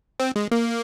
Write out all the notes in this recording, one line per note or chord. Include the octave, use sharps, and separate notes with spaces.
C4
G#3
A#3